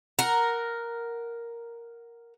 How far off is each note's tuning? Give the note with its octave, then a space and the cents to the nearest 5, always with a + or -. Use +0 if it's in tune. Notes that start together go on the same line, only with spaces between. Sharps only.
A#4 +0 F#5 +0